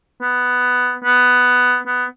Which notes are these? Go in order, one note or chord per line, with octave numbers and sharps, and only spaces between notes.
B3
B3
B3